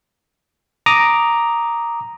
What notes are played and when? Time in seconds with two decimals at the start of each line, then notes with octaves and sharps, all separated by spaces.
0.86 A#5 D6 D#6